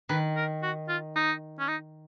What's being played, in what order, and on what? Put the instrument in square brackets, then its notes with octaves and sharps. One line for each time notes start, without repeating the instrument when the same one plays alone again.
[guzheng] D#3 [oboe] B4
[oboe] A#4
F#4
F4
D#4
C#4
D#4